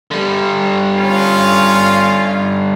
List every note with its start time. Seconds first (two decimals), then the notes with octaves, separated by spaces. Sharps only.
0.11 D3 G3
0.95 C#4 F4